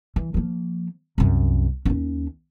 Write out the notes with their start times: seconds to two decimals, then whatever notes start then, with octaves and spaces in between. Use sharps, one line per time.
0.16 E3
0.34 F3 A#3
1.18 C2 F#2
1.85 D#2 C#4